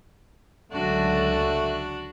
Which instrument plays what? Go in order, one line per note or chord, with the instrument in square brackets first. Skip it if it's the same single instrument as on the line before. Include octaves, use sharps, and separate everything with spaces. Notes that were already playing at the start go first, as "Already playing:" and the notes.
[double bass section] C#2 D3 F#3 [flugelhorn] A3 [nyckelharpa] D4 F#4